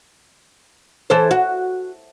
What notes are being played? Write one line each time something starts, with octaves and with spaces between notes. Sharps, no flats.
E3 A4 C5
F#4